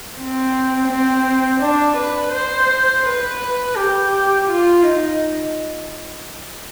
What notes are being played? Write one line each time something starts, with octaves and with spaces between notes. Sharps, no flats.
C4
C4
D4
B4
C5
B4
B4
G4
F4
D#4